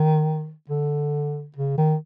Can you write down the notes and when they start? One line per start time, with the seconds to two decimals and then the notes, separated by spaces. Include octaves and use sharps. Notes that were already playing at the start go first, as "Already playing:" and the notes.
Already playing: D#3
0.70 D3
1.56 C#3
1.78 D#3